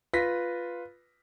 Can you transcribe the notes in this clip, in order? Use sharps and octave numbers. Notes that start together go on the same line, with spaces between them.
F4 B4 A#6 B6